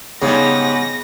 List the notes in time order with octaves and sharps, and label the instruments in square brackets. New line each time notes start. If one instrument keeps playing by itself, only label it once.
[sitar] G#2 G3 [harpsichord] C#3 [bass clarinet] B3 [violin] A#6